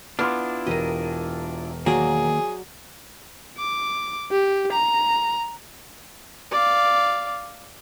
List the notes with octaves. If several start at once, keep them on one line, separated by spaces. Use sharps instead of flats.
B3 D4 E4 F4 C6 D6 F6
E1 G4 A#4 D#5 D#7
D#3 F#3 A#3 G#4 D5
D6
G4
A#5
D5 F5